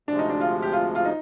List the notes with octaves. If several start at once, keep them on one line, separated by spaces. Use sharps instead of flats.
D2 C3 F3 G#3 D4
D#4
D4
F4
G4
F4
F4
D#4